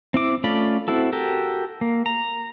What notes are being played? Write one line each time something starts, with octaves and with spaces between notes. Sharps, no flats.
C4 E4 D6
A3 C#4 F4 D5 B5
C4 E4 F#4 A4
F#4 G4 A4 A#4
A#3
A#5